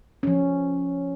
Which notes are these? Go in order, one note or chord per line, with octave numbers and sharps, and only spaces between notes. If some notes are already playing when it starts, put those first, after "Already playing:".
F3 C#4